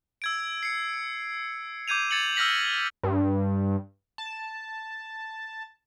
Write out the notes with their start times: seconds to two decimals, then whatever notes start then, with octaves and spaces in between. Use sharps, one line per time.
0.22 E6 G#6 D7
0.63 C7 C#7
1.88 D6 G6 G#6 D#7 F7
2.11 G#6 A6 C#7 F#7
2.36 E6 F6 G6 A#6 B6 F#7
3.03 G2
4.18 A5